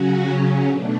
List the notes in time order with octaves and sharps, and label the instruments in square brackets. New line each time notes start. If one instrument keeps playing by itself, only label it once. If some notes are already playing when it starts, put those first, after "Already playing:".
Already playing: [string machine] C#3 F#3 C#4 F#4
B2 A3 D4